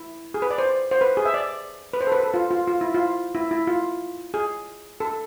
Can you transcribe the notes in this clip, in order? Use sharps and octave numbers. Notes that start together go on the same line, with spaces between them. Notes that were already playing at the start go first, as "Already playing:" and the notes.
Already playing: E4
G#4
B4
D5
C5
C5
B4
G#4
E5
D5
B4
C5
A4
B4
A4
F4
F4
F4
E4
F4
E4
E4
F4
G#4
A4